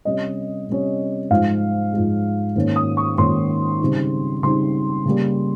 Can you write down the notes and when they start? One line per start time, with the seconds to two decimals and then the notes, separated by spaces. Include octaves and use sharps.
0.05 C3 G3 C#4 D#5
0.68 C3 G3 C#4
1.30 G#2 F3 G#3 F5
1.93 G#2 F3 G#3
2.56 G#2 D#3 A#3 C#4
2.76 D#6
2.97 C#6
3.18 G#2 D#3 A#3 C#4 C6
3.81 C#3 G3 C4 D#4
4.43 C#3 G3 C4 D#4 C6
5.05 C#3 G3 A#3